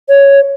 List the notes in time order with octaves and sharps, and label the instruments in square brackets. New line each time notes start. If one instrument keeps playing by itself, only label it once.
[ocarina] C#5